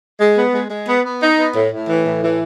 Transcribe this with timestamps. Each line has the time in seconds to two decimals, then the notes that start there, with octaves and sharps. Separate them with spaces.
0.20 G#3
0.38 B3
0.54 G#3
0.70 G#3
0.87 B3
1.04 B3
1.21 D#4
1.38 B3
1.54 A2
1.72 A2
1.88 E3
2.05 A2
2.22 E3